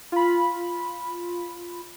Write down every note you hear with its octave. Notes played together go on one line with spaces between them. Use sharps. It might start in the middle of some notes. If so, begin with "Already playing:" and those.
F4 B5